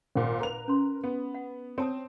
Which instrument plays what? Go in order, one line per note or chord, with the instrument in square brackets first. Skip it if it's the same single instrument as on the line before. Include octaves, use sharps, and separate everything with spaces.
[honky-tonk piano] G#1 A#2
A#4 B4 F7
[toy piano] C#4 C6
[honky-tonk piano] B3
[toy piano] F#5
[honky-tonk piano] C4 [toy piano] C#5 A5 D#6